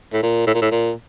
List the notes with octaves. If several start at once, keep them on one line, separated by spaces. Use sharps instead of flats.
A2
A#2
A2
A#2
A2
A#2